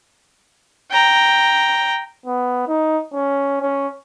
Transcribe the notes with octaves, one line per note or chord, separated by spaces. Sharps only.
G5 A#5
B3
D#4
C#4
C#4